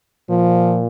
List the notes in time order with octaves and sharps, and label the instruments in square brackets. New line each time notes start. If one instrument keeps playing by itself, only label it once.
[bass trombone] A#2 [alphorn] F3